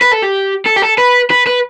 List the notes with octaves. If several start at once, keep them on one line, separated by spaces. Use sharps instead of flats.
B4
A4
G4
A4
G4
A4
B4
B4
B4